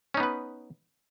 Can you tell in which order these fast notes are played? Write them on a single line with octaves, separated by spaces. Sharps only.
C#4 D#4 B3 B4